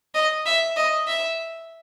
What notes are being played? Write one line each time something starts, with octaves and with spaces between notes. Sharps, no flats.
D#5
E5
D#5
E5